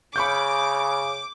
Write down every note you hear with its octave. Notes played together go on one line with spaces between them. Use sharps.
C#3 B5 C#6 D6 G6